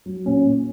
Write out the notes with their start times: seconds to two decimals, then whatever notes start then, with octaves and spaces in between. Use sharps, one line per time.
0.06 F#3
0.25 A#2 C#4
0.44 A#2